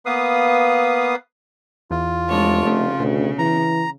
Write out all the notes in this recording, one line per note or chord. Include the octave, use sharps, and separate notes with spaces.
A#3 B3 B4 F5 D#6
E2 F4
F1 G#3 D4 C#5
C#3 A3
D2 B2
E3 A#5